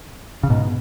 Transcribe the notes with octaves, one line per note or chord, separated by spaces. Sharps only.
C#3
G#2 B2